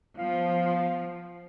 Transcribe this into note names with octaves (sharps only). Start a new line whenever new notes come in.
F3 B3 F5